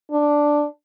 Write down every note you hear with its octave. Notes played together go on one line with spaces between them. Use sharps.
D4